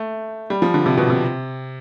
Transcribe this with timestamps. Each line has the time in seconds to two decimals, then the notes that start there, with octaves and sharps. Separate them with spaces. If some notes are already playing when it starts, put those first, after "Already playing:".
Already playing: A3
0.50 G3
0.62 F3
0.74 D3
0.86 C3
0.97 B2
1.10 C3